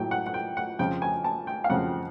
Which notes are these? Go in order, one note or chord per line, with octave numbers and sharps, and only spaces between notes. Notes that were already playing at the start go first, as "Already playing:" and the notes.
Already playing: A2 F#3 A3 G5
F#5
F#5
G5
F#5
F2 C#3 F3 G5
G#5
A5
G5
F5
F2 C#3 F3 F#5